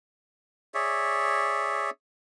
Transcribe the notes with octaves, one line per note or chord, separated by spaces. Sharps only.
G#4 C#5 D5 E5